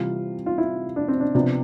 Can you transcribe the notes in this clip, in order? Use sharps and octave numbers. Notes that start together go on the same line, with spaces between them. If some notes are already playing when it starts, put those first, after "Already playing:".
Already playing: C3 E3 G3 F4
F4
E4
D4
C4
D4
C3 F3 B3 D4